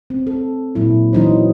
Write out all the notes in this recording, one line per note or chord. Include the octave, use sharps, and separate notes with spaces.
C4
A4
A#2 F#3 E4
E3 F#3 D#4 C5